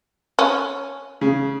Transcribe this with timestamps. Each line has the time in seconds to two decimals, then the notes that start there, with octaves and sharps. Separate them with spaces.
0.39 C#4
1.21 C#3